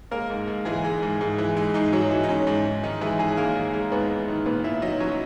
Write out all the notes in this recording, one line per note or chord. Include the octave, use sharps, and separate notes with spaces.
G#3 A#3 A#4
G#2
G#2
E3 G#3 G#4
G#3
G#2
G#2
E3
G#3
G#2 D#4
G#2 F#3 F#4
E3 D#4
D#4
G#3 C#4
G#2
G#2
D#3 D#4
E3 G#3 E4
G#2 G#3 G#4
G#2 A#3 A#4
D#3
G#3
G#2 B3 B4
G#2
D#3
A#2 B3 B4
A#2 E4 E5
F#3 D#4 D#5
F#3 C#4 C#5